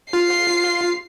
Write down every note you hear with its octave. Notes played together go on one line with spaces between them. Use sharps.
F4 C7